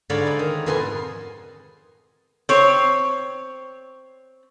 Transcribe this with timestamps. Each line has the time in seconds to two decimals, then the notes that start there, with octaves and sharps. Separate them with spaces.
0.10 G#2 D3 C#5 D5 F5 B5
0.27 D#4
0.39 D#3
0.66 F2 B2 B3 A4 G#5 C6
2.49 C4 C#5